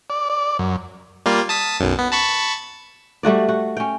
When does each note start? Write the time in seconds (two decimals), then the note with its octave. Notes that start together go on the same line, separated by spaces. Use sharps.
0.10 D5
0.30 D5
0.59 F#2
1.26 G3 A#3 F4
1.49 A5 D#6 B6
1.80 B1 F#2
1.99 B3
2.12 A5 B5 C#6
3.23 G3 A3 F#4 D5
3.49 F#4
3.77 C#4 G5